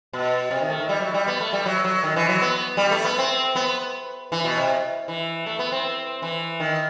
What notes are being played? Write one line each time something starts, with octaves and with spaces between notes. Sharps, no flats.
B2
C3
D#3
A3
D#3
G3
F#3
G3
B3
A3
G3
F#3
F#3
D#3
E3
F#3
B3
G3
A3
B3
C4
B3
E3
B2
C3
E3
A3
B3
C4
E3
D#3